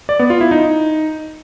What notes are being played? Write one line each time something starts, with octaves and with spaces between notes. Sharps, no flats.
D5
B3
F4
E4
D#4